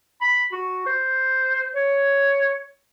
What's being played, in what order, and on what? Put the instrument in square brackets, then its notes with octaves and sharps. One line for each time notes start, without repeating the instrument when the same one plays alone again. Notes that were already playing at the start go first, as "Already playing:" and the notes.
[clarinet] B5
F#4
C5
C#5